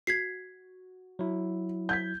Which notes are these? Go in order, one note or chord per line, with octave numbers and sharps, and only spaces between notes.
F#4 G#6 B6 C7
F#3 E4
G6 G#6 B6